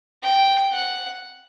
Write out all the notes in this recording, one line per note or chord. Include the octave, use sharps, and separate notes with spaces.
G5
F#5